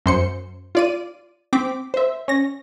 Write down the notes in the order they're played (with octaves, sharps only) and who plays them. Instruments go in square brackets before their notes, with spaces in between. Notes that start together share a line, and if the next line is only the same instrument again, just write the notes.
[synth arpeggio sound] F#2 C5 C#7
F4 D5 D#7
C4 D6 B6
C5 E5
C#4 A#6